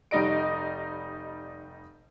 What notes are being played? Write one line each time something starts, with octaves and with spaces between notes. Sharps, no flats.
F1 G3 D#4 D#5 D7